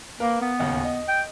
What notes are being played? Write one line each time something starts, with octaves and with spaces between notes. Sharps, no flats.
A#3 A#4 B4 F5
B3
D1 D#2 C#3
D#5
G5